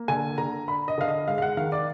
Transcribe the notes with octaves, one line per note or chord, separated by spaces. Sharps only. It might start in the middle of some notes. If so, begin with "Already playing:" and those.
Already playing: A#3
D3 G#5
D3 A#5
D4 B5
D#5
D3 F5
D#5
G#3 F5
F5
F#5
D#3 F5
D5